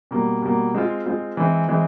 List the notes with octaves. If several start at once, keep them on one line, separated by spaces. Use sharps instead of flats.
B2 G3 A#3
B2 G3 A#3
G#3 C4 F4
G#3 C4 F4
E3 G#3 C4
E3 G#3 C4